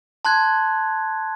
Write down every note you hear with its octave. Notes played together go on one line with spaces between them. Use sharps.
A5 C6 F#6 G#6